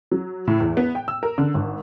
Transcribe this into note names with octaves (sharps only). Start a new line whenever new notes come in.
F#3
A2
E2
B3
G5
E6
A#4
D3
G#1